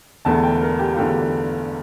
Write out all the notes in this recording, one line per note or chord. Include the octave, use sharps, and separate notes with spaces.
E1 E2 D3 A3 A5
G5
A#4
G4
F4
E1 E2 D3 A3 G4